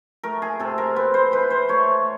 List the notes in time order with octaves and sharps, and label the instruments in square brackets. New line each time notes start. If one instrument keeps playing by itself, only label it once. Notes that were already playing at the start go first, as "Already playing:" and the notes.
[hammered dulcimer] A3 A#4
G#4
C3 A4
A#4
C4 B4
C5
E3 B4
C5
A3 C#5